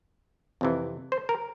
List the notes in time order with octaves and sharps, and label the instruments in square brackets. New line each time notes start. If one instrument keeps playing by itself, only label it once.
[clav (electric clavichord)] F2 C3 E3
C5
A#4